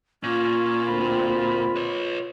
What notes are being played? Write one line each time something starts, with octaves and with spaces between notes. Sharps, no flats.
A#2 C#4 F4
D2 C4 B5
B4 C#5